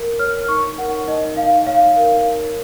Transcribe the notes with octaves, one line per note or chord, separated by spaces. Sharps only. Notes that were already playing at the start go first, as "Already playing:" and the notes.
Already playing: A#4
C#5 F6
D#4 C#6
A#4 F#5
D#4 D#5
D#4 F5
C#5 F5
A#4
D#4